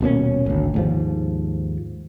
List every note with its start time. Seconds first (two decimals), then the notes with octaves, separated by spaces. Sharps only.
0.01 D#1 B2 A#3 C#4
0.46 G#1 D2
0.74 D#2 G#2 F3